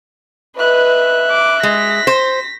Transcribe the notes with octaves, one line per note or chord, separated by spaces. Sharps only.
B4 D#5 E5 F#6
D6
G#3 A#6 B6
C5